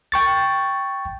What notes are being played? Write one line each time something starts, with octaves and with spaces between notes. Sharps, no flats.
G5 C#6 A6